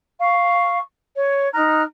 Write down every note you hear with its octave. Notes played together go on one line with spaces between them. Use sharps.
F5 C#6
C#5
D#4 A#5 F6 F#6